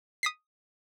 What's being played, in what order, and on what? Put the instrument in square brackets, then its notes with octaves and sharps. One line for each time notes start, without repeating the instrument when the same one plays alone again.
[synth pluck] D#6 B6 C7